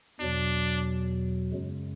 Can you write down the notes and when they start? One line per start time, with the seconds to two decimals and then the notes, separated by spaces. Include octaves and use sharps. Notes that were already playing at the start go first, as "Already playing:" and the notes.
0.20 E2 B2 F#3 D4
1.53 F#2 C#3 G#3